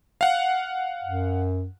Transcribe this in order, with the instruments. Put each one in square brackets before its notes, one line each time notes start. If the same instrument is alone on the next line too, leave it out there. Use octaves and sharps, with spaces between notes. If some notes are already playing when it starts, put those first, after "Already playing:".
[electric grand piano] F5 F#5
[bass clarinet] F#2